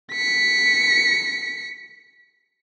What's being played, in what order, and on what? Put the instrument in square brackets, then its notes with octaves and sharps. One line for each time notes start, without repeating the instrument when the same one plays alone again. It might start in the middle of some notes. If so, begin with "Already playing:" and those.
[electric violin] B6 C#7